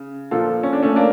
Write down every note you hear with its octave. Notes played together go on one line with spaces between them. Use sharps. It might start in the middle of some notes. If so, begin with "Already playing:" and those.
Already playing: C#3
A#2 F3 F4 A4
C#4
D4
A3 C#4
A#3 D4